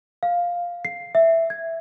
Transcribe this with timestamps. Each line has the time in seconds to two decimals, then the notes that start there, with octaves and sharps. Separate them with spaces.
0.23 F5
0.85 C7
1.15 E5
1.50 G#6